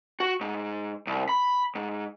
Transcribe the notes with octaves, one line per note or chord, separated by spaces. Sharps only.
F#4
G#2
C2
B5
G#2